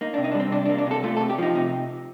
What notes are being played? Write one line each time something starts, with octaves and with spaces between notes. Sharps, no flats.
A#3 D#4
D4
C3
D#4
D4
G3
C4
C3 D4
D4
A#3
D4
C3 A4
A3 F4
A4
C3
G4
F3 D#4
C3 D#4